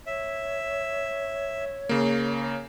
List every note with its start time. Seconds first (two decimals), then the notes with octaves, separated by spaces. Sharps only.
0.06 C#5 E5
1.89 C#3 A#3